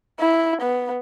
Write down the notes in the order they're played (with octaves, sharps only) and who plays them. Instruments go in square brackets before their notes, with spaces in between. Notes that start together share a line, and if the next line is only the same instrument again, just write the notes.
[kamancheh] E4
B3